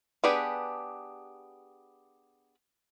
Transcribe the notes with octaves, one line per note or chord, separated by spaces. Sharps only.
B3 D4 G4 G#4 B4